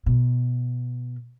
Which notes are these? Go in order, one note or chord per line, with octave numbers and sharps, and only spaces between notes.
B2